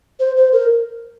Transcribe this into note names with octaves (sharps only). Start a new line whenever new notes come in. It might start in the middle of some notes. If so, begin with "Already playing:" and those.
C5
C5
A#4